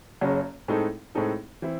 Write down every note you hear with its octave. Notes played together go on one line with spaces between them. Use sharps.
F#1 F#2 C#3 F#3 C#4
A2 G#3 C4 D#4 A4
A2 G#3 C4 D#4 A4
E3 C4 E4